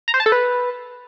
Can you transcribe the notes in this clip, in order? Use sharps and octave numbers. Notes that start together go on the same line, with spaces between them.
A#5
C5
A5
A4
B4